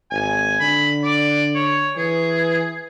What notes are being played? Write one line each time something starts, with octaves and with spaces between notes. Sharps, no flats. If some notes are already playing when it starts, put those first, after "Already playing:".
G#1 G#5
D3 B5
D5
C#5
E3 G#4